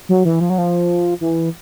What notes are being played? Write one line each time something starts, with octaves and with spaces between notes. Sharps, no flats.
F#3
E3
F3
F#3
F3
E3